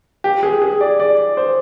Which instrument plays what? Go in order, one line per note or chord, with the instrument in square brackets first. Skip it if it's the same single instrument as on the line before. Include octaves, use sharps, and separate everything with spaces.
[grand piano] G4
G#4
G#4
D5
D5
C5